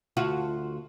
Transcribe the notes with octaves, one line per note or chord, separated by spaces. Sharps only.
D2 F4 F#4